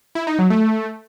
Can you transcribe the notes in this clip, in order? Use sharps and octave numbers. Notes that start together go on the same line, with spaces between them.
E4
D#4
F#3
A3